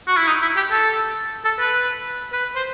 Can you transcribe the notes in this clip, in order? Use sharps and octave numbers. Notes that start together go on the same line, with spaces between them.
F#4
E4
D#4
E4
G4
A4
A4
B4
B4
C5